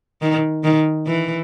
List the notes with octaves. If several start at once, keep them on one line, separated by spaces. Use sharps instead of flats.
D#3
D#3
E3